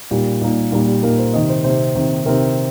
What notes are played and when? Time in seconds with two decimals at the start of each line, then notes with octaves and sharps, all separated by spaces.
0.11 A#2 G3 A#3 D#4 G4
0.41 A#2 G3 A#3 D#4
0.72 A#2 G3 A#3 D#4 A#4
0.88 G4
1.03 A#2 G3 A#3 D#4 A#4
1.18 C5
1.34 C3 D#3 C4 D#5
1.49 C5
1.64 C3 D#3 C4 C5
1.95 C3 D#3 C4
2.26 C3 D#3 C4 A#4